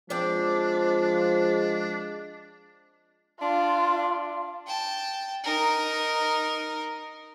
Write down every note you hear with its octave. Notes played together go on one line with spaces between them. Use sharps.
F3 G#3 C4 D4 D5
D4 F4
G5 A5
D#4 A#4